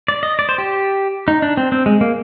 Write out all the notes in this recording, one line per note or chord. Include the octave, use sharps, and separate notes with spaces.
D5
D#5
D5
C5
G4
D#4
D4
C4
C4
G#3
A#3